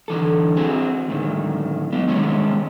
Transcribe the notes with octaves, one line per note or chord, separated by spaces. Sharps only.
D3 E3 A4
C4 F#4 G#4
D2 A2 D#3
F#3 B3
C2 D#3 G#3 C#4 C#5